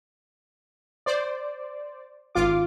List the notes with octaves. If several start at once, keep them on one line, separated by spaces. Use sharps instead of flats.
C5 D5
G#1 F4 D6